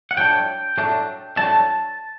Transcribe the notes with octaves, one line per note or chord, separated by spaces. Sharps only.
F#5
A2 F#3 A3 D4 G5
A2 F#3 A3 D4
A2 F#3 A3 D4 A5